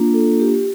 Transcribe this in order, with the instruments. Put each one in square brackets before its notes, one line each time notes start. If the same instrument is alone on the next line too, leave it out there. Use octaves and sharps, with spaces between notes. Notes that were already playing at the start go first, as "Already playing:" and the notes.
Already playing: [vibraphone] A#3 D4 F4
A4
G4